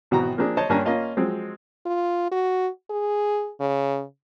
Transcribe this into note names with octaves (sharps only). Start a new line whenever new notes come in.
G#1 B2 E3 F#4 G5 A#5
F3 A#3 C4 D4 G#4
C5 C#5 D#5 A5
G2 A#3 C#4 D4 G#5 A#5
A#3 C#4 F4 D#5 F5 A5
F3 F#3 G#3 C4
F4
F#4
G#4
C#3